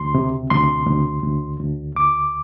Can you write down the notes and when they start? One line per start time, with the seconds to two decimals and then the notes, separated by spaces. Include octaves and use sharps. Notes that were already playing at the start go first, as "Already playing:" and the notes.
Already playing: D2 C6
0.14 C3
0.50 D2 C6
0.86 D2
1.22 D2
1.60 D2
1.95 D2 D6